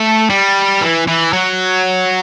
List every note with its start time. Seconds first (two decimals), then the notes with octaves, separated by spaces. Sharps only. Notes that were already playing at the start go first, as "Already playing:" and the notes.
Already playing: A3
0.29 G3
0.81 E3
1.07 E3
1.33 F#3